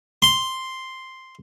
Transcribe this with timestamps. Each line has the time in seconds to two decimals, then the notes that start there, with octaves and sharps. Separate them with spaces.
0.22 C6